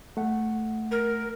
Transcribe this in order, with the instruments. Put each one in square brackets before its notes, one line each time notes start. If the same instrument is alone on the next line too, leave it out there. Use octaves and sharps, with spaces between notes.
[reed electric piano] A3 F#5
[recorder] A#4